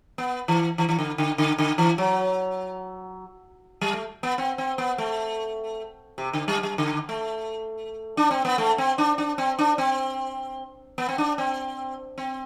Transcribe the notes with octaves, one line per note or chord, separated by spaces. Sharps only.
B3
E3
E3
E3
D3
D3
D3
D3
E3
F#3
G3
A3
B3
C4
C4
B3
A3
C3
D3
G3
G3
D3
A3
D4
C4
B3
A3
C4
D4
D4
C4
D4
C4
B3
C4
D4
C4
C4